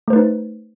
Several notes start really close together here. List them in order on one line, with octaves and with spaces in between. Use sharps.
A3 C5 B4 D#4